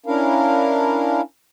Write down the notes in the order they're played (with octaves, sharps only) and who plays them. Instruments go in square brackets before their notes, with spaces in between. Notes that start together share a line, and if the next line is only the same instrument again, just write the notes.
[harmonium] C#4 D4 E4 A#4 F5